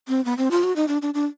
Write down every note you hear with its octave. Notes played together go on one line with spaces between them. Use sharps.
C4
B3
C4
F4
F#4
D#4
D4
D4
D4